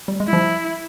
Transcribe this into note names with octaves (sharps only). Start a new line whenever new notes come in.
G3
G#3
E4
F3 G3